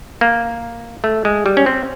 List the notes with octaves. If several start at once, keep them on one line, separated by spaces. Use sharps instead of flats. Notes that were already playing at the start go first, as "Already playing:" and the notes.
A#3
A3
G#3
G3
C#4
C4